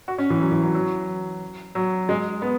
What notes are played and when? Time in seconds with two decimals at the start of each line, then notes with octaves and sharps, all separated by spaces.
0.08 F#4
0.18 C#4
0.30 E3
0.41 F#3
0.52 E3
0.63 F#3
0.75 F#3
1.75 F#3
2.09 G#3
2.42 B3